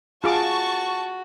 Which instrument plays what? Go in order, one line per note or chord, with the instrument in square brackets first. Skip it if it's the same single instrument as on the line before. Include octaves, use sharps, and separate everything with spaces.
[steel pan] F4 G#4 D6 [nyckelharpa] F#4 [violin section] A5 C#6